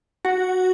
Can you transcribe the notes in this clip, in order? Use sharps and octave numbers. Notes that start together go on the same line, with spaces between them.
F#4 F#5